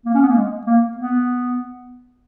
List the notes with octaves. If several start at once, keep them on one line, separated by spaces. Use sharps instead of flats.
A#3
C#4
B3
A#3
G#3
A#3
B3